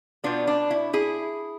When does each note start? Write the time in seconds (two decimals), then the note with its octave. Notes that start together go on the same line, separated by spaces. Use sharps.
0.24 B2 B3 D4 F4
0.47 D4
0.71 E4
0.93 E4 G#4